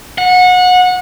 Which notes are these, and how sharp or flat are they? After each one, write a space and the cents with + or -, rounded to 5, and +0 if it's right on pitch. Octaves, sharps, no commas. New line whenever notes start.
F#5 -25